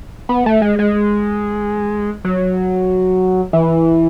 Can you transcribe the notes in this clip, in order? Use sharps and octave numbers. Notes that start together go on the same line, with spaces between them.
B3
A3
G#3
G#3
F#3
E3